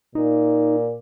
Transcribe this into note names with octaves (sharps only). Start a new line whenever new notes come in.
A#2 D#4